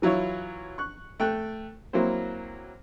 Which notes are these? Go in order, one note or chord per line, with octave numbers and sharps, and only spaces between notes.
E3 F#3 E4 F4 C#5
C#6 F#6
A3 G5 F#6
F#3 A#3 C4 E4 C5